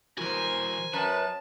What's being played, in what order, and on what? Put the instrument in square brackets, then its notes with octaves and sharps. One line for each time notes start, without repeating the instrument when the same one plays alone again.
[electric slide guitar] E3 E4 F#4 [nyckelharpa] A#4 C5 [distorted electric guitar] G#5
[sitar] F#2 [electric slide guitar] B4 [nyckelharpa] A5